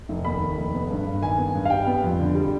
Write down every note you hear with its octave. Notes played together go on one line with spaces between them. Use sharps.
F1
D#2 B5
D#3
F1
B3
G2
G2
D#3 G#5
B3
G2
F5
G3 G5
B3
F2
D3
G3